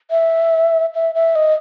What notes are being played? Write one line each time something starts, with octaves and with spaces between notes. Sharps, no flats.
E5
E5
E5
D#5